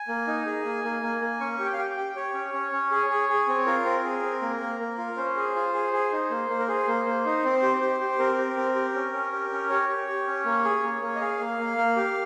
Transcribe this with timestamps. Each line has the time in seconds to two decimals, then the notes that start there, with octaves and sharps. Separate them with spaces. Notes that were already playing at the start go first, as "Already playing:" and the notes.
Already playing: G#5
0.08 A#3
0.27 D#4
0.46 G#4
0.65 A#3
0.84 A#3
1.02 A#3
1.21 A#3
1.40 C#4 C#6
1.59 G4
1.65 G5
1.73 F5
1.78 G4 G5
1.90 G5
1.97 G4
2.16 G4 C#5
2.34 C#4
2.53 C#4
2.72 C#4
2.91 G#4
3.10 G#4
3.29 G#4
3.48 C4
3.66 F4 A#4
3.85 C4
4.04 G#4
4.23 C4
4.42 A#3
4.60 A#3
4.80 A#3
4.98 F4
5.17 C#4 C5
5.36 G#4
5.56 F4
5.74 G#4
5.93 G#4
6.12 D#4
6.30 A#3
6.49 A#3
6.59 A#4
6.68 G#4 C5
6.87 A#3
7.06 A#3
7.25 D#4
7.44 C4
7.62 G4
7.81 G4
8.00 G4
8.19 C4 A#4
8.38 G4
8.57 C4
8.75 G4
8.95 C#4
9.13 C#4
9.33 G4
9.51 C#4
9.70 G4 C#5
9.89 G4
10.08 G4
10.27 C#4
10.45 A#3
10.64 G#4
10.83 A#3
11.02 A#3
11.15 D#5
11.21 G#4 F5
11.40 A#3
11.58 A#3
11.77 A#3
11.96 G4